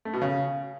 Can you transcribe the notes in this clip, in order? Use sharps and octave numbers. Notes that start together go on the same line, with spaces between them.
A3
B2
C#3